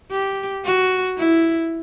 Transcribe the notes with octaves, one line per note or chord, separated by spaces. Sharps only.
G4
F#4
E4